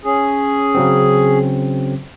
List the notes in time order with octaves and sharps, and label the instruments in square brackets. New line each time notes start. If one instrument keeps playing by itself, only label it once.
[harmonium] C#4 G#4
[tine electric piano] C#3 F#3 C4